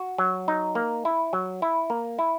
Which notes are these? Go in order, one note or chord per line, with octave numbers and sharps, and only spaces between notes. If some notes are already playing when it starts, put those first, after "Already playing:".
Already playing: F#4
F#3
D#4
A#3
E4
F#3
E4
A#3
E4